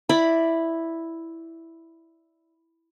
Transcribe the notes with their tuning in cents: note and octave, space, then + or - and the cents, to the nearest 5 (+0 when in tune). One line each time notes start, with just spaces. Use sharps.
E4 +0 D5 +0 B5 +0